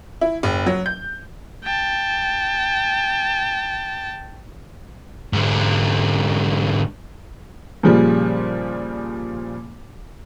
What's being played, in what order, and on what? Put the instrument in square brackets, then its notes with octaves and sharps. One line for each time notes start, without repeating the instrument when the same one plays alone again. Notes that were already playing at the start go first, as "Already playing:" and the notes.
[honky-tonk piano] E4
F#1
F#3
G6
[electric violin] G5 A5
[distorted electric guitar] G#2 D3
[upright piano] A#2 C#3 F3 G3